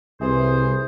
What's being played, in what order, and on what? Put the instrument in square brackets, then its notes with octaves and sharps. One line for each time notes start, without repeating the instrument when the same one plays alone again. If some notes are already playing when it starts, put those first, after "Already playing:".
[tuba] C2 [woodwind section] E3 G#4 C5